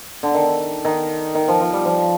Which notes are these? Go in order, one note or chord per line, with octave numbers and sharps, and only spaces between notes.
D3
D#3
D#3
D#3
F3
F3
G3
F3